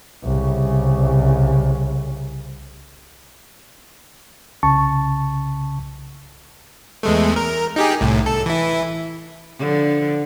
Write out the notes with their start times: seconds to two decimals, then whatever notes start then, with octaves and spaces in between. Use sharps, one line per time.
0.24 C2 C#3
4.63 C2 C#3 A5 C#6
7.03 E2 G#3 A3
7.36 A#4
7.76 D#4 G4 G#4
8.01 C2 A2
8.26 A4
8.46 E3 E4
9.59 D3 F3